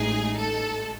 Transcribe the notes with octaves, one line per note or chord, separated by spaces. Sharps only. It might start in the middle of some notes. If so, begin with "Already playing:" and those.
Already playing: A1 A2 G#3 D#4 G#4
A4